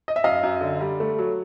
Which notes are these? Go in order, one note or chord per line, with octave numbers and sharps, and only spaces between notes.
D#5
E5
F#2 D#5 F5
F#2
D3
G3
A3
F#3